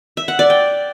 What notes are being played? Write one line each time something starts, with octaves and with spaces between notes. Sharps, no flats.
E5
F#5
D5
G5